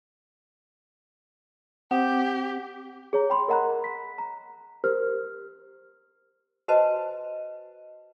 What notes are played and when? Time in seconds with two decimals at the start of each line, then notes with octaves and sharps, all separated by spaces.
1.91 C4 G4 F#5
3.13 G#4 C#5 A#5
3.30 G5 B5 C6
3.48 A#4 D#5 F#5 A#5 B5 F#6
3.84 B6
4.18 A#5
4.84 G4 A#4 C5 F6
6.68 F#4 B4 C5 D#5 G#5 A5